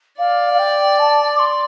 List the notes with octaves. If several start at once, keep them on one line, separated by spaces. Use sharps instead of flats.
D5 F5
F5
G5
A5
D6
C6